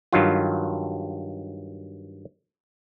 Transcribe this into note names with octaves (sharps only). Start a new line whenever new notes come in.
G2 D#3 F#3 F4